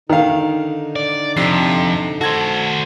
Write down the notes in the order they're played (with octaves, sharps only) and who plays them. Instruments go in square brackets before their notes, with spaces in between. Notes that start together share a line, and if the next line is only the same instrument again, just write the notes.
[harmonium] D3 D#4 [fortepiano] D#3 F5
[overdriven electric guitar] D5
[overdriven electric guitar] F2 [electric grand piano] C3 C7
[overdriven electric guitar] F#4 C5 [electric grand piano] A4 G#6